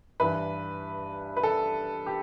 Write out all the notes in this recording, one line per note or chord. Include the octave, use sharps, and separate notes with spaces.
G2 E3 B4
B4
A4
G4